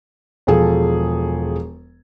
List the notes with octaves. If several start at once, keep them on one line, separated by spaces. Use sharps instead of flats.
E1 F3 G#4 A4